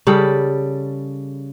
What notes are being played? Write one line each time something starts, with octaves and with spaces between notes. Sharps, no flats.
C#3 G3 A4